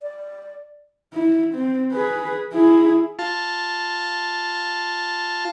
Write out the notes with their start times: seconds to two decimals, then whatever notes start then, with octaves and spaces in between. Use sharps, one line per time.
0.02 D5
1.13 E4
1.54 C4
1.92 G#4 B4
2.53 E4 G#4
3.19 F4 A5